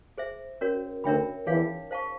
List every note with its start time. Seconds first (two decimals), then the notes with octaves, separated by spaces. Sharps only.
0.18 G#4 C5 E5
0.61 C#4 F#4 A#4 C#5
1.04 D2 D3 A#4 C#5 E5 G5 B5
1.47 E2 E3 D#4 G#4 C#5 F5
1.91 C5 F5 A5 C#6